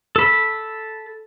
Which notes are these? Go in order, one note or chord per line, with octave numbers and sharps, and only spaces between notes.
A4 B5